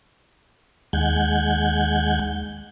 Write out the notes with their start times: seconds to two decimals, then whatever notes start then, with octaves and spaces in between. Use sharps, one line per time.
0.93 D#2 G#3 F#5 G6 G#6